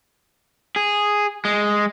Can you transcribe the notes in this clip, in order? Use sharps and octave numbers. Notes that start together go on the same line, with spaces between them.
G#4
G#3